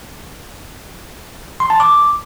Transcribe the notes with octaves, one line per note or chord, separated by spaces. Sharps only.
C6
A5
D6